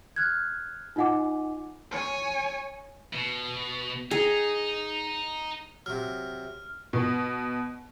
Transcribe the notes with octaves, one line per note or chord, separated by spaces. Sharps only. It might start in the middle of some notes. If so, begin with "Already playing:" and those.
F6 F#6 G#6
D#4 F4 D#5 F#5 G#5 D6
C#5 G#5
B2
D#4 G#4
C3 F#3 F6
B2